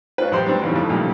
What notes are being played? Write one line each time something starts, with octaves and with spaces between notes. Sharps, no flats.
G#2 C#4 F4 B4
A1 F#2 G4 C5 C6
G3 C4 D4
E2 G2 C#3 E3
F2 A3
F#2 A#2 C#3 G3